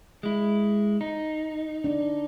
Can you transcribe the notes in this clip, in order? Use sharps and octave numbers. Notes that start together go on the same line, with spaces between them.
G#3 E4
D#4
D4